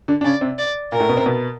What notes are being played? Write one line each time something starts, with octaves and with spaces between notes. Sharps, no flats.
D3 D4
D4
C#3 C#4 D5
C3 C4
D5
A#2 A#3 A#4
A2 A3
B2 B3
C3 C4
B2 B3